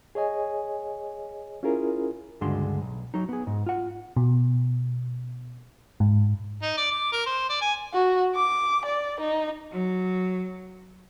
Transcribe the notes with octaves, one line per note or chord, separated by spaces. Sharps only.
G#4 C#5 D#5 G#5
C#4 E4 F4 G#4 A#4
C#2 G2 D3 G#3 F#4 C6
B1
F#3 D#4
B3 G#4
G#2
F4 F#5
B2
G#2
D#4
D5
D6
A#4
C5
D5
G#5
F#4
D6
D5
D#4
F#3